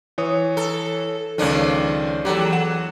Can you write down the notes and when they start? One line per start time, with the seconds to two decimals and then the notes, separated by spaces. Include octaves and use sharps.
0.18 E3 C#5 D#6
0.57 A4
1.38 C#2 D#3 F3 C#4 D4
2.25 E2 G2 F#3 G4 A4
2.52 F#5 E7